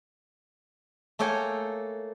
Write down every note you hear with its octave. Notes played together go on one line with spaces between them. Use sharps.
A3 A#3 A4 C#5 G5 G#5